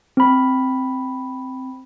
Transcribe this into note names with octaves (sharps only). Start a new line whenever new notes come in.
C4 B5